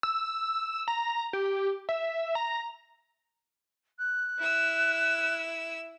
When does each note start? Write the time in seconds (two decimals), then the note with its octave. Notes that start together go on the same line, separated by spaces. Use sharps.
0.03 E6
0.88 A#5
1.33 G4
1.89 E5
2.35 A#5
3.99 F#6
4.38 E4 E6